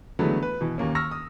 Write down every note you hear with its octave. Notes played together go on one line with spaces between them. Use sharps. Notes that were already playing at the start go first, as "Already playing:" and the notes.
D3 E3 F#3 G#3 A3 B3
B4
B2 E3
D#2 A#3 C#4
C#6 E6 F6 A#6
D#6